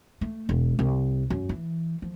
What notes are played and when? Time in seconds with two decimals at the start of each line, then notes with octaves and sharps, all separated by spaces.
0.21 A3
0.49 E1
0.79 C2
1.30 F#2
1.49 E3
2.02 F3